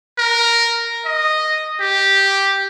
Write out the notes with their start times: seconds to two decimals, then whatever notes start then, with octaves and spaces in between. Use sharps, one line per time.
0.18 A#4
1.05 D#5
1.81 G4